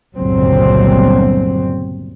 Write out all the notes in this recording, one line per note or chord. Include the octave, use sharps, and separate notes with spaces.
G1 C#2 A#2 F#3 C4